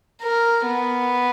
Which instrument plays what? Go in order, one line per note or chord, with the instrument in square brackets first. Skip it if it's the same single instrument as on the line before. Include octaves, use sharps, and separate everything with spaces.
[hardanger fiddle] A#4
B3